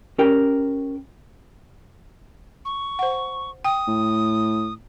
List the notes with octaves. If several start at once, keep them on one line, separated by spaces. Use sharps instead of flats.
C#4 G4 A#4 G5
C#6
C5 F#5
G5 D#6
A2